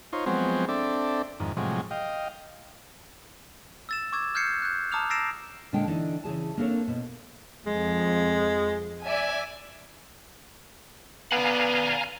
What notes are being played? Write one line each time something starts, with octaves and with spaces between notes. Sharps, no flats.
D#4 F4 C5 C#5
F3 F#3 G#3 B3 C4 C5
C4 D4 A4 D5 E5
F2 G#2 D#3
A2 C3 F3 F#3 G#3
D#5 F5 G5
E6 A6 E7
C#6 D6 E6 G#6
F6 G6 G#6 C7 C#7
F#6 G6
A5 A#5 D6 D#6 F6 F7
E6 A6 A#6 C7 D7 E7
A#2 D3 G#3 D4 G5 A5
D3 E3 D4 D#4
C#3 E3 G#4 A5
A#3 C4 D4 A4 A#4 C#5
B2
F2 G#3
D5 E5 G#5
B3 D5 F5 F#5 G#5 A#5